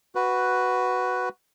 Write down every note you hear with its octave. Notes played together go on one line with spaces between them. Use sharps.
F#4 B4